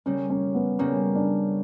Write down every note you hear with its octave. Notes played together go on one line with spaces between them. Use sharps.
C#3 G3 A#3 C#4
C#4
B3
C#3 G3 A#3 C#4
D4